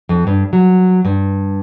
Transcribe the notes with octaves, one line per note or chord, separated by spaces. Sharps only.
F2
G2
F#3
G2